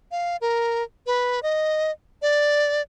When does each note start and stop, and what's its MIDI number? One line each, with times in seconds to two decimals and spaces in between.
0.11 0.37 77
0.41 0.83 70
1.07 1.42 71
1.43 1.91 75
2.22 2.82 74